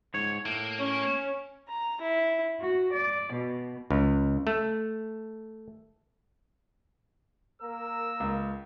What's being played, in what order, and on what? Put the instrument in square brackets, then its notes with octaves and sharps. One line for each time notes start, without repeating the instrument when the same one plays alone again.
[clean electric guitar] G#2 C#5
[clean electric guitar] A2 [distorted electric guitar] A#3
[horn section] C#4 [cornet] C#5
[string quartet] A#5
E4
F#4
D5
B2
[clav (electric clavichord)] C#2
A3
[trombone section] A#3 A#4 [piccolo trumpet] E6
[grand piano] C#2